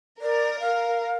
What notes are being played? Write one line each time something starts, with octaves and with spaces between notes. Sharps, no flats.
A#4 D5
F5